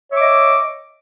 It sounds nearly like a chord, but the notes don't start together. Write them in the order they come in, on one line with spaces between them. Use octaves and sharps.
C#5 E5 D6 D#5